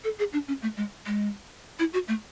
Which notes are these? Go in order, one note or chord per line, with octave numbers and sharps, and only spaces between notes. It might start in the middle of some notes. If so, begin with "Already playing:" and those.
A4
G#4
D4
C#4
A3
G#3
G#3
E4
F#4
A3